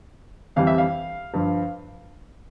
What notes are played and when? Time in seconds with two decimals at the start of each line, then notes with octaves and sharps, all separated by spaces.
0.56 F2 E3 G3 F5
0.67 E5
0.78 F5
1.34 G2 F3